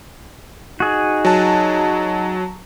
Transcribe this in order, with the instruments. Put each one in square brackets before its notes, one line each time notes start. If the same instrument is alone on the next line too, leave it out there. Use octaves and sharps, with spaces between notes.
[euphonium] D#4 [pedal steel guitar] F#4 G#4
[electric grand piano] F#3 A5